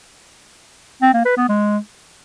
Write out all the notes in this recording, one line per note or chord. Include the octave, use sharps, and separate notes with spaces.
C4
A#3
B4
B3
G#3